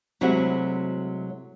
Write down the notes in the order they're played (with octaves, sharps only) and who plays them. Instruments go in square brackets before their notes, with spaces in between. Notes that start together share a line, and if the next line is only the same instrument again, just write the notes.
[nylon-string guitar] C3 F#3 G#3 A3 E4 F#4